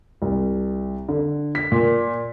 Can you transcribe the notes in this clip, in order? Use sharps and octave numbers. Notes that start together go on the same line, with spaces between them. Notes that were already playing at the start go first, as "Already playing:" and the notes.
C2
D3
B6
A#2